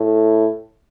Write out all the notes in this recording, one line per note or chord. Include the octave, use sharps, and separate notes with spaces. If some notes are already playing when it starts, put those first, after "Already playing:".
Already playing: A2